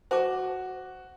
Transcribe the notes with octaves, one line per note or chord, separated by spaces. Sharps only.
F#4 C5 A5 D6